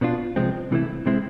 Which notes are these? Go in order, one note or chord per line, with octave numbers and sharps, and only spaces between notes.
B2 B3 D4 F4
C2 C3 F3 G#3 C4
C2 C3 E3 A3 E4
C3 G#3 C4 E4